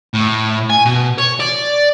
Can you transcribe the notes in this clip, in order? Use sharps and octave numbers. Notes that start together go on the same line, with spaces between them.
A2
G#5
B2
C#5
D5